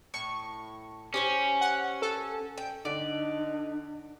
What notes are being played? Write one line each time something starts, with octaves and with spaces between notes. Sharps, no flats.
A2 C#6
C#4 G4 C5 C#5
F#5
A4
G5
D3 D4 D#4 D5